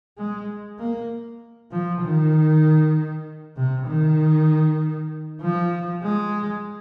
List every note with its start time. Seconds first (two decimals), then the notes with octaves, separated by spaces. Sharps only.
0.18 G#3
0.79 A#3
1.72 F3
2.02 D#3
3.56 C3
3.87 D#3
5.41 F3
6.03 G#3